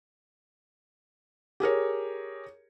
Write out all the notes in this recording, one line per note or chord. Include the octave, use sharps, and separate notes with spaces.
G4 G#4 A#4 C#5